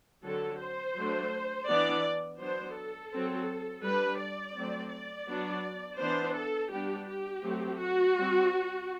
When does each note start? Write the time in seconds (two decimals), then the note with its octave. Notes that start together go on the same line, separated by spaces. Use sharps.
0.24 D3 F#3 C4 A4
0.61 C5
0.96 F#3 A3 D4
1.68 E3 B3 D4 D5
2.40 F#3 B3 D4 C5
2.76 A4
3.12 F#3 C4
3.84 G3 D4 B4
4.20 D5
4.55 F#3 A3 C4
4.92 D5
5.28 F#3 B3 D4
5.99 E3 B3 D4 C5
6.36 A4
6.71 G3 B3 D4 G4
7.08 G4
7.43 F#3 A3 C4
7.79 F#4
8.15 G3 C4